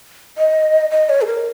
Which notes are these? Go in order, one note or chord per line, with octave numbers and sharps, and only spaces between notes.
D#5
D#5
C#5
G#4
A#4